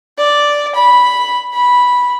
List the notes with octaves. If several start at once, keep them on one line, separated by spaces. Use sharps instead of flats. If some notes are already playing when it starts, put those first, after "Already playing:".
D5
B5
B5